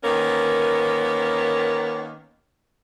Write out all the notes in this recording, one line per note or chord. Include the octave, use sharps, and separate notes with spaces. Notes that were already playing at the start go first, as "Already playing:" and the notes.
D#3 A#3 B3 C#4